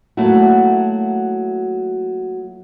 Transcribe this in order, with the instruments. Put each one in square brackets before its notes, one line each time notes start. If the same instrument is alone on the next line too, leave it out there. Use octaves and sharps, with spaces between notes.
[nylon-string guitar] F#3 A3 A#3 E4 F#4